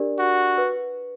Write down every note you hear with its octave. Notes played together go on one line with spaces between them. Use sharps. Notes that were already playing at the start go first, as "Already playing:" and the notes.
Already playing: D4 G4 A#4 D5
F#4
B4